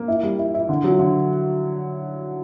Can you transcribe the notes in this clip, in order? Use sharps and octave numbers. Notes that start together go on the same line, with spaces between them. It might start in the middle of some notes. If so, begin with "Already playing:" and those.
Already playing: A#3
E4
G3
E4
E4
D3
F#3
D3